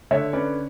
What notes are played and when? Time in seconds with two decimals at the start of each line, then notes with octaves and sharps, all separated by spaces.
0.11 D3 C#5 E5
0.33 C#4 B4 D5